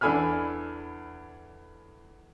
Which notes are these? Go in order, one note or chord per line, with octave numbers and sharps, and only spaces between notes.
E2 D4 A4 G#5 B5 F6